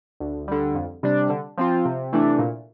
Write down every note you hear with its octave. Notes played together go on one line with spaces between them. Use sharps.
D2
D3 G3
F2
C3 G3 D4
D3
F3 C4 F4
C3
E3 A3 D4
A#2